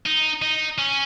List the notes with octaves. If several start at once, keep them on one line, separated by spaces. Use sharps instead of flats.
D#4
D#4
C#4